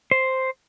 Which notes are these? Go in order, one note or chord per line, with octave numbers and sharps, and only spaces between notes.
C5